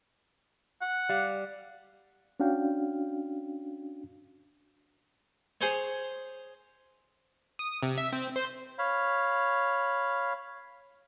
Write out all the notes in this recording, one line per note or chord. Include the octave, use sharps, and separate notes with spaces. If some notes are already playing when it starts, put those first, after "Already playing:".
F#5
G3 F5
C#4 D4 F#4 F5 G5
G#4 C5 C#5
D#6
C3
E5
C4
C5
C#5 F5 B5